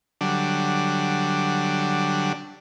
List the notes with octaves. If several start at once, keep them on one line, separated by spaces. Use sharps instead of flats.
D3 F#3 G3 D4